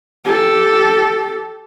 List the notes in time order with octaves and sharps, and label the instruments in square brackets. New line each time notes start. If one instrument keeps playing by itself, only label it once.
[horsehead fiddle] G4 A4